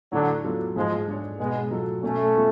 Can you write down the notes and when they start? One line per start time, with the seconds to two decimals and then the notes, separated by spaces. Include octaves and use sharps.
0.12 A2 D3 F#3
0.44 F#3 B3 F4 A4
0.76 G#2 F3 G#3
1.08 G#3 D4 G#4 C#5
1.39 B2 G#3 B3
1.71 F#3 A3 F4 A4
2.03 B2 A3 C#4
2.35 G#3 B3 F4 A4